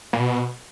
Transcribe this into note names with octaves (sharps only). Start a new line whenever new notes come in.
A#2
B2